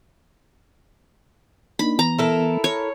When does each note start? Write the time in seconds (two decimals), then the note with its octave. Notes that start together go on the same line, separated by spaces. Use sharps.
1.79 A#3 D4 D#4 B5
1.99 E3 B3 A#5
2.18 E4 A4 A#4
2.64 C#5